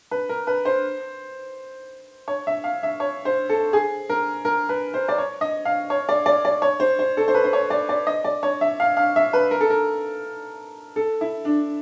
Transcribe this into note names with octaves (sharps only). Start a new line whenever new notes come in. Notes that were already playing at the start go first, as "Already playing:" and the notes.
B4
A#4
B4
C5
C#5
E5
F5
E5
C#5
C5
A4
G#4
A#4
A#4
B4
C5
D5
C#5
D#5
F5
C#5
D5
D5
D5
C#5
C5
C5
A4
C5
B4
C5
C#5
D5
D5
D#5
D5
C#5
E5
F5
F5
E5
B4
A#4
A4
A#4
A4
E4
D4